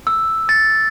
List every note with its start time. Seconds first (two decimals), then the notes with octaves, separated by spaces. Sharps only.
0.07 E6
0.49 A6